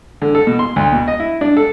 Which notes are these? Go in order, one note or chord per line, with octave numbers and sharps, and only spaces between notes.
D3
A4
B2
C6
D2
B2
D#5
E4
D4
A4